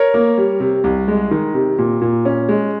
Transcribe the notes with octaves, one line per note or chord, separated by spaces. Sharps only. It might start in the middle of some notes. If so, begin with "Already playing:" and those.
Already playing: A#4 C#5
A#3
G3
C3
C2
G#3
D#3
C3
A#2
A#2
C#4
G#3